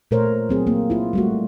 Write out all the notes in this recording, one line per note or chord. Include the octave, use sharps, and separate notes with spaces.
A#2 A3 A#4 C5 C#5
F#3 C4 G#4
A#3
E4 F4
G3 A3 F#4